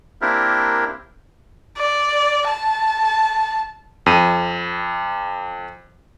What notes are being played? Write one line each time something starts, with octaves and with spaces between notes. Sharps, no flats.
A#3 C4 D4 E4 G4 A#4
D5
A5
F2 D#7